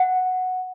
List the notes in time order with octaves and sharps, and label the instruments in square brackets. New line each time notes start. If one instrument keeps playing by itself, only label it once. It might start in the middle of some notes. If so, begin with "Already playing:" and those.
Already playing: [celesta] F#5